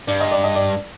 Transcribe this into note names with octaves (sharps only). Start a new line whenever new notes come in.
G2 D5
D#5
D5
D#5
D5